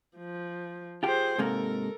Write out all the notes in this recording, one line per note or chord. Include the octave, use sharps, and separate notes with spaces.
F3
F4 G4 G#4 C5
G#2 C3 A#3 A4 A#4